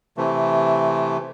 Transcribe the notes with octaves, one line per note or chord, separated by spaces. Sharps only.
C3 E3 A3